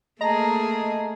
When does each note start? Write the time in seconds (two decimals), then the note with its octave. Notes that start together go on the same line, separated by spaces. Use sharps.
0.21 A3 A#3 G#4 D#5 A5 A#5